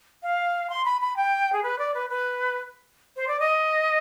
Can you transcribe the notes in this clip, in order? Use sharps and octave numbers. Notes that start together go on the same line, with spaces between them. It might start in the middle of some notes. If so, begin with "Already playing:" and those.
F5
C6
B5
B5
G5
G#4
B4
D5
B4
B4
C5
D5
D#5